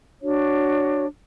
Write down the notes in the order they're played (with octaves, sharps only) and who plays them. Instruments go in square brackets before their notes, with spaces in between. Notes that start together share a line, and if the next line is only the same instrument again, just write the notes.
[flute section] D4 F#4 C#5